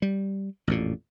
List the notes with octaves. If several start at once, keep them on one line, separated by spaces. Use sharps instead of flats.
G3
A1 F2 A#2